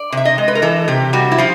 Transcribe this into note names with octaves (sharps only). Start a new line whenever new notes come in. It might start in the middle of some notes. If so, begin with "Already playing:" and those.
Already playing: D5
C3 E5
D#5
G#3
B4
A#4
E3 A4
C3 G4
G3 F#4
E4
F3 F4